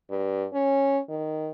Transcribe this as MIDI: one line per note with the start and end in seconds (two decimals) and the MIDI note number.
0.10 0.46 43
0.53 0.98 61
1.09 1.52 51